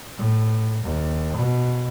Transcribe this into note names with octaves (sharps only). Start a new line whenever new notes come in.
A2
D#2
B2